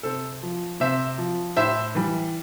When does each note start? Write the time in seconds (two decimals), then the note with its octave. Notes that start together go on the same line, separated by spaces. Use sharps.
0.03 C3 A4 C5
0.43 F3
0.80 C3 C5 E5
1.18 F3
1.56 A2 C5 E5
1.95 E3 G3